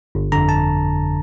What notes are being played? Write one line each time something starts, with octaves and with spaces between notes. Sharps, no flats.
G1
F2 D3 A#5
A5